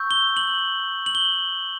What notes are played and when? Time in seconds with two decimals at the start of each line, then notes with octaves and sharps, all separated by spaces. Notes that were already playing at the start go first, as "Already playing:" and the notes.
Already playing: C#6 E6 G6
0.11 G7
0.37 F#7
1.06 F#7
1.15 G7